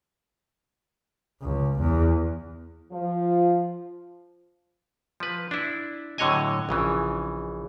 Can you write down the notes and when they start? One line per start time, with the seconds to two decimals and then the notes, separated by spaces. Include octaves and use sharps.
1.41 C#2
1.79 E2
2.91 F3
5.20 F3 B4
5.51 D4 E4
6.18 A2 D3 F#3 C#5 D#5 G#5
6.69 A#1 C#3 E3